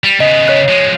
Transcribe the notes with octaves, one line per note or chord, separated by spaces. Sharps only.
G3
C#3 B3 D#5
C#5 F#6
F3 G#3